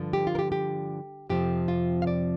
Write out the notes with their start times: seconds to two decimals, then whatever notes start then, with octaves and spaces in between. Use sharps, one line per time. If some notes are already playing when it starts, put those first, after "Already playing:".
Already playing: G2 D3 F3
0.13 G4
0.27 F4
0.35 A#4
0.39 G4
0.52 G4
1.29 F2 C3 F3 C4 G4
1.68 F4
2.02 F5
2.07 D5